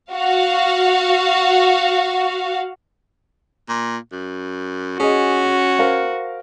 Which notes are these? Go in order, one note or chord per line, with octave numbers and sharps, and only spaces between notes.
F#4 F5
A#2
F#2
C#4 F#4 G#4 D#5
A#4 C5 F5